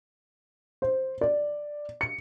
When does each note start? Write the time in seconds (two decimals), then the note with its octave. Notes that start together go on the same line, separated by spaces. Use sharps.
0.82 C5
1.21 D5
2.01 C#7